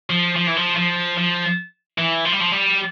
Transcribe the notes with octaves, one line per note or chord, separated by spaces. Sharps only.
F3
F3
E3
F3
F3
F3
E3
F3
G3
F3
G3